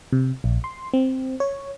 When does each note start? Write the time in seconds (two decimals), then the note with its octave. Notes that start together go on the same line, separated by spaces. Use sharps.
0.13 C3
0.44 A#1
0.64 C6
0.94 C4
1.40 C#5